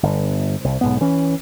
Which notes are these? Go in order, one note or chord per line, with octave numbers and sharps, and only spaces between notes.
G1
C2
B1 G#2 B3
E3 C#4